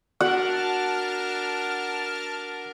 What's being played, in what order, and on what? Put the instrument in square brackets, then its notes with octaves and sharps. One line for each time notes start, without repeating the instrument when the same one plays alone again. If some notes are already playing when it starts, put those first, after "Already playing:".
[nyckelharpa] D4 A#4 [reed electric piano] F#4 [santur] F#5 [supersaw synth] A5 F6